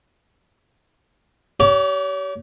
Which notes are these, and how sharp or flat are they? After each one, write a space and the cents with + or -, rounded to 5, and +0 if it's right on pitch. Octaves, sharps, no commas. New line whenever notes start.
G4 -30 C#5 +35